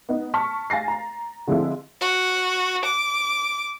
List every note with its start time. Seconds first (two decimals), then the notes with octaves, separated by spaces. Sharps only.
0.09 B3 D#4
0.34 A5 C#6 F6 B6
0.70 F5 G#5 A6 A#6 C7
0.88 A#5
1.47 D3 F3 G#3 C4 E4 F4
2.01 F#4
2.85 D6